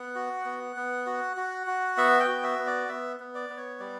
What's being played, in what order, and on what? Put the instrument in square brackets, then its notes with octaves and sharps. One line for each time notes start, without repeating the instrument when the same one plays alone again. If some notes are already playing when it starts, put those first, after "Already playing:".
Already playing: [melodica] B3 F#5
F#4
B3
B3
F#4
F#4
F#4
B3 E5
G5
F#4
E5
B3
D5
B3 E5
B3
D5
B3
C#5
G3 D5